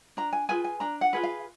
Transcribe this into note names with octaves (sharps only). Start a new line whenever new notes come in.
D4 A#5
G#5
F4 G#4 B4 G#5
G#5
D4 A#5
F#5
F4 G#4 B4
F5